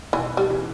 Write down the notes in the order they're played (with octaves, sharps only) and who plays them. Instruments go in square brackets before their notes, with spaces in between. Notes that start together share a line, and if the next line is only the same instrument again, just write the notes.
[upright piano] B2 D#3 [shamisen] E3
[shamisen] G3
[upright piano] C#3 E3